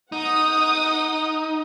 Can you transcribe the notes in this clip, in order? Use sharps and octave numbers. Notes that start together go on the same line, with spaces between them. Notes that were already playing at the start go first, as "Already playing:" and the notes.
D#4 F#5 D#6